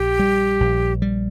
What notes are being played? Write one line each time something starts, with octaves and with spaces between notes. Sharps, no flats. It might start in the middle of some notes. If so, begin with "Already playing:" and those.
Already playing: A#1 G4
G3
A#1
G3